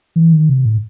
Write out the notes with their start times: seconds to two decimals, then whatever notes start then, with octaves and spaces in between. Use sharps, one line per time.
0.16 E3
0.33 D#3
0.49 C3
0.65 A2